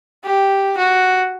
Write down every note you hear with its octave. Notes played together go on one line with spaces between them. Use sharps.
G4
F#4